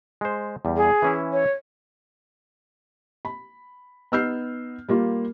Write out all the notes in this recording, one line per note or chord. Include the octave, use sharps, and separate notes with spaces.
G#3 C5
E2 G3
G#4
E3 C#4 E4
C#5
B5
B3 D#4 E6 F6 G6 C7
G3 A#3 F4